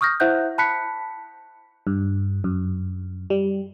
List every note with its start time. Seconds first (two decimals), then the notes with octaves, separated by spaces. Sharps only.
0.01 C#6 D#6 F6 G6 A#6
0.20 E4 C5 E5 F#5 F#6 G6
0.58 A5 B5 F#6 B6 C#7
1.87 G2
2.44 F#2
3.30 G3